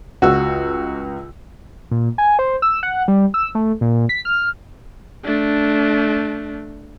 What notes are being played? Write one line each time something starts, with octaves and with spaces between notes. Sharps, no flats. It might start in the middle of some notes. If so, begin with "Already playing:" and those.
C#2 F#4 E6
A#2
G#5
C5
E6
F#5
G3
E6
A3
A#2
B6
F6
A3 D4